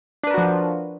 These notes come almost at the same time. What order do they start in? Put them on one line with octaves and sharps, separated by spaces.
D4 B4 A#4 F#4 F3